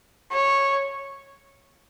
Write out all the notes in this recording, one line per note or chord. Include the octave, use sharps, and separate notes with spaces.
C#5